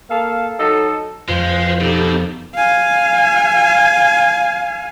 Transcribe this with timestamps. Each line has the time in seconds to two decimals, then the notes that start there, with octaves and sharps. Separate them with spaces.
0.10 A#3 A4 F5
0.59 F#3 D#4 A4
1.28 F2 F3 G#3 F4 B4 C5
1.80 B2 D#4 G4 A4
2.55 F5 G#5